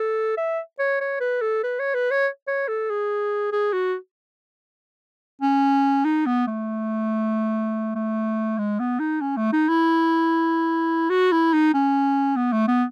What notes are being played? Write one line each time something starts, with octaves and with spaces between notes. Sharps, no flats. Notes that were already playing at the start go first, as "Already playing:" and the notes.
Already playing: A4
E5
C#5
C#5
B4
A4
B4
C#5
B4
C#5
C#5
A4
G#4
G#4
F#4
C#4
D#4
B3
A3
A3
G#3
B3
D#4
C#4
A3
D#4
E4
F#4
E4
D#4
C#4
B3
A3
B3